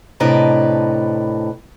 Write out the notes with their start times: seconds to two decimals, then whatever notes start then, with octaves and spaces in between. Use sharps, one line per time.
0.20 A2 C3 D4 B4 D#5 A#5